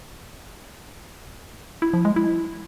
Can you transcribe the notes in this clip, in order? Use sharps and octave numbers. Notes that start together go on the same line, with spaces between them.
E4
F3
G#3
E4